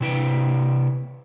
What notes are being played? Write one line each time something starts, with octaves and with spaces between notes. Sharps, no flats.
C3 E4 B4 G5